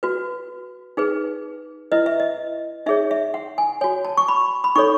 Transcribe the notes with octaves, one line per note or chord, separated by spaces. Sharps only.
F#4 B4
D#4 G#4 B4
E4 B4 D#5
E5
D#5
D#4 G#4 C#5 E5
E5
F#5
G#5
F#4 C#5 G#5
A5
C#6
B5
B5
D#4 A4 C#5 C#6